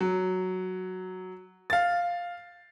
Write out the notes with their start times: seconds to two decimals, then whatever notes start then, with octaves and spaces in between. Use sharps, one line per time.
0.01 F#3
1.70 F5 A6